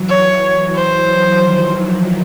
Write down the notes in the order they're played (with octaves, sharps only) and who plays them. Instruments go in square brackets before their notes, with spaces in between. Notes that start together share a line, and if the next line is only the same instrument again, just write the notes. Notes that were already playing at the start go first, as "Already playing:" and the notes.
Already playing: [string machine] E3 F#3
[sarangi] C#5
C5
[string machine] D#3 F3